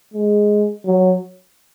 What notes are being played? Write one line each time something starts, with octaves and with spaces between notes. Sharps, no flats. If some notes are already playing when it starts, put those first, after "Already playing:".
G#3
F#3